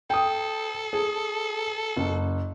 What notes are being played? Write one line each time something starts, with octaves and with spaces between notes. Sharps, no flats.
A4 G5 D#6
G#4
F#1